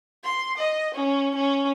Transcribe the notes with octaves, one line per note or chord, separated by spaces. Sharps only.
C6
D#5
C#4
C#4